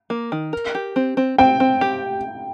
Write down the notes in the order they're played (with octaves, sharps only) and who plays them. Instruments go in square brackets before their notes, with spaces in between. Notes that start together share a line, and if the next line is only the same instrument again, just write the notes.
[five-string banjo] A#3
D#3
A#4
G4
C4
C4
[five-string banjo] C4 [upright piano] G5
[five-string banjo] C4
G4